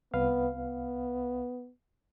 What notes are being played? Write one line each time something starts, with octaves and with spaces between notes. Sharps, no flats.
C2 B3 B4 F5
B3